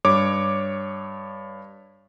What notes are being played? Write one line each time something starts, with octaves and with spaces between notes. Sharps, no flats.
G2 C#5 D6